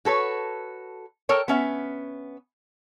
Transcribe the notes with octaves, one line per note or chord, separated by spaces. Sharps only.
F#4 A4 B4 C#5
A4 A#4 C#5 G5
B3 C#4 E5